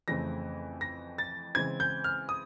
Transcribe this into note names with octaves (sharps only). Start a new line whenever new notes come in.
F2 C#3 E3 A3 C4 A#6
A#6
A6
C#3 E3 G#3 C4 G#6
G6
F6
D#6